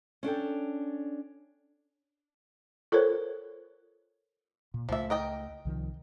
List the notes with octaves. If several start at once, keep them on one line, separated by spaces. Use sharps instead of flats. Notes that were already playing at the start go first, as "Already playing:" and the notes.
C#4 D4 A4 G5
F4 A4 A#4 C5 C#5
A#2
C#2 F3 A3 E5
A#4 D#5 G5
C2 D#3 F3